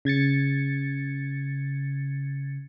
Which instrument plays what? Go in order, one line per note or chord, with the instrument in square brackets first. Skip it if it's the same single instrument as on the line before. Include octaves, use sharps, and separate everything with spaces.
[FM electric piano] C#3 G#6 A6 C#7